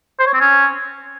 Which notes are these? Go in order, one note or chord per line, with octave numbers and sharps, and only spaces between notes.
C5
C#5
C4
C#4